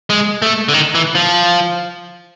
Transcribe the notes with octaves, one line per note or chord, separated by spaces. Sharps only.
G#3
A3
D3
D#3
E3
F3